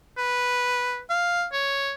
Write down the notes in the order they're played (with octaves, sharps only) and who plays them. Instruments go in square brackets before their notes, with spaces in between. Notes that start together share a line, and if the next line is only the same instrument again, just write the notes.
[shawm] B4
F5
C#5